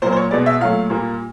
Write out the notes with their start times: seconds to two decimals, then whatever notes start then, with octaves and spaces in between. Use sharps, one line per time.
0.02 A#2 F#3 A#3 C5
0.12 C5
0.17 C#5
0.31 B2 G#3 B3 D5
0.46 E5
0.60 A#2 F#3 A3 F5
0.90 A#2 G3 A#3